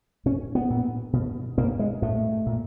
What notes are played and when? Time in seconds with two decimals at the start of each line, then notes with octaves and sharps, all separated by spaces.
0.26 B2 C#4
0.55 B3
0.70 A#2
1.13 B2
1.58 B2 A#3
1.79 G#3
2.02 A2 A3
2.46 A#2